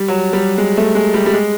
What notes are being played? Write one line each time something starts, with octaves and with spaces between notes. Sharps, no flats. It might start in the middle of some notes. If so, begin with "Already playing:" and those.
Already playing: G3
F#3
G3
G#3
A3
G#3
G3
G3
G#3